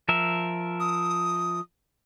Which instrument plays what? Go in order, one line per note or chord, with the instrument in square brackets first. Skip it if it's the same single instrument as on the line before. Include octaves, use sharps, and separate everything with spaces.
[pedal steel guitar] F3 A#4 E5
[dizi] D#6